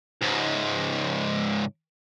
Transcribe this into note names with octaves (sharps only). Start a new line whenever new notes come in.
C#2 G#2